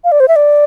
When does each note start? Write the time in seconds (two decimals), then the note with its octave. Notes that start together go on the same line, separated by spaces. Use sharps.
0.04 F5
0.12 D5
0.20 C5
0.28 E5
0.36 D5